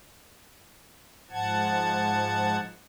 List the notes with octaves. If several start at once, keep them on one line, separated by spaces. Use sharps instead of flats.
G#2 F3 F#5 A5 G#6